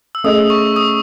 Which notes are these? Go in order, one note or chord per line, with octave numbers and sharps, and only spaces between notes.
E6
A3 C#4 G#4 D#5 D#6
C#6
D#6